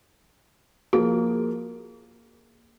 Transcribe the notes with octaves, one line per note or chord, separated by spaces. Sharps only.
F3 A#3 F4 F#4 G#4